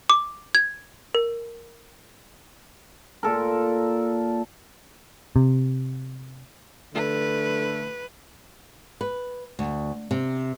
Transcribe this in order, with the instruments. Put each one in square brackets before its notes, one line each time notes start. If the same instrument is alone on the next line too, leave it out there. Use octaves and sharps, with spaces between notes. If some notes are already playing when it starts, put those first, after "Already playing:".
[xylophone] D6
G#6
A#4
[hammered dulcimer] A#2 A4 A#4
[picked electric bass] C3
[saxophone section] D3 A3 [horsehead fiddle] B4
[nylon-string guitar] B4
D2
C3